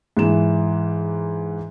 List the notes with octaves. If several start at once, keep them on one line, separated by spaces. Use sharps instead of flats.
G#2 E3 E7